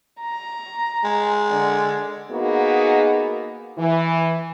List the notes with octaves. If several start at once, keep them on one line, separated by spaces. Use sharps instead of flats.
A#5
G#3
D3
A#3 B3 D#4 F#4 G#4
E3